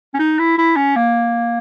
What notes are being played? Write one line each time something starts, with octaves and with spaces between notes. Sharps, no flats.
C#4
D#4
E4
E4
C#4
A#3